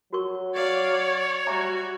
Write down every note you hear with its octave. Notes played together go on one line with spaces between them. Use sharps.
F#3 F#4 A#4 C#6
C#5 D5 F5
D5
G3 F#4 E5 G#5 A#5